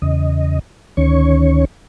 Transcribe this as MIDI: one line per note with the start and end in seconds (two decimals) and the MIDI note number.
0.02 0.59 40
0.02 0.59 49
0.02 0.59 75
0.97 1.65 38
0.97 1.65 51
0.97 1.65 61
0.97 1.65 73
0.97 1.65 85